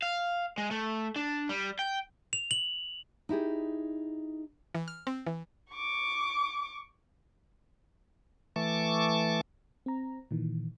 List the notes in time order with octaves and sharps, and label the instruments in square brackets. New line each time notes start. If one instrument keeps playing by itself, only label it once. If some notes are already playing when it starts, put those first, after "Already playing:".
[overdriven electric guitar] F5
G#3
A3
D4
G3
G5
[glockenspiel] F7
F#7
[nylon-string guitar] D#4 E4 G4 G#4
[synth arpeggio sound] E3
F6
C4
E3
[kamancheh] C#6 D6
[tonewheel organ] E3 A3 A5 C#6 D6
[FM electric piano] C4 A#5
A#2 D#3 E3